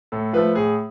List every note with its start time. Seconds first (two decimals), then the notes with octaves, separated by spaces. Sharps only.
0.12 A2 A4
0.33 F3 A3 B4
0.55 A2 G#4